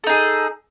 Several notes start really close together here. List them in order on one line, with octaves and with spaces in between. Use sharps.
A4 D#4 G#4